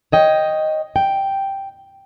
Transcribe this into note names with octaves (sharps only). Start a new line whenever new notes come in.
C#5 D#5 G5
G5